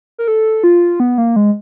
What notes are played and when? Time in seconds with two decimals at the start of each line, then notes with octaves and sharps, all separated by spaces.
0.18 A#4
0.28 A4
0.64 F4
1.00 B3
1.18 A#3
1.36 G#3